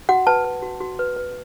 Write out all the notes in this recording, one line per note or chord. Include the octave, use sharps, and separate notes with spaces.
F#4 F#5
B4 A5
B4
F#4
F#4
B4
B4